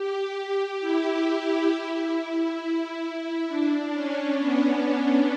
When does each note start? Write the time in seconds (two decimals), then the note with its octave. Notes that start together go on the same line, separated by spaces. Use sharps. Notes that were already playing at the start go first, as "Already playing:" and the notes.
Already playing: G4
0.36 G4
0.81 E4
1.70 E4
2.15 E4
3.48 D4
3.93 C#4
4.38 B3